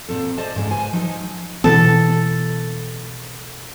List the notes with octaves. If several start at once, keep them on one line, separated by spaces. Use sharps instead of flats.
A#2 C4 A4
C5 D5 D#5 A5
G#2 C#3 G#3
B4 C5 G#5
F3 F#3 D#4
B2 E3 B3 A4